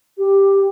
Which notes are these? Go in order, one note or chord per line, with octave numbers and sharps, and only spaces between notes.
G4